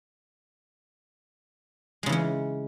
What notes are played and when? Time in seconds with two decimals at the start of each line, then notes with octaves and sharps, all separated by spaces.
2.03 G#3
2.06 C#3
2.09 E3
2.12 C#4